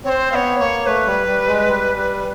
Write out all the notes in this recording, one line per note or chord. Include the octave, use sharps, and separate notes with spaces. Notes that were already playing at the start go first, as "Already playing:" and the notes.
C4 C5 C#5
B3 C#5 F5
A#3 C#5
A3 B4
G3
G3
G#3
G3
G3